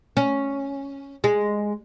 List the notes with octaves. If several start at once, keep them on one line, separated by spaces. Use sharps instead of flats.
C#4
G#3